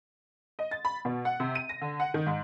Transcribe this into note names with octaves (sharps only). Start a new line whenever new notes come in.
D#5
A6
B5
B2
F#5
C3
D#7
A#6
D3
F#5
D#3
G#2